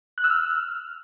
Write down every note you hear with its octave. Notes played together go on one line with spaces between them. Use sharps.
F#6
E6
F6